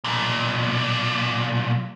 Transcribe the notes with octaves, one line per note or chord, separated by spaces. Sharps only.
B1 A#2